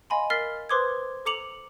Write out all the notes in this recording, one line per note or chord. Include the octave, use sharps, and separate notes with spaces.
D#5 F5 G#5 B5 C6
A#4 F6 A6 B6 C7 G7
B4 C5 C6 D6 D#6 G#6
A4 A#5 D6 C#7 F7 F#7